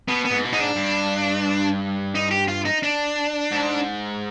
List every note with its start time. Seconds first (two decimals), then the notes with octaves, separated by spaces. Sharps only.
0.08 B2 B3
0.25 B3
0.31 G#2
0.45 B2
0.53 G#2 D#4
0.60 D4
0.77 G2
2.15 D#4
2.31 G4
2.48 F4
2.65 D#4
2.83 D4
3.52 G#2